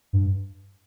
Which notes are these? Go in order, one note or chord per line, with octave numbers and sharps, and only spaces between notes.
G2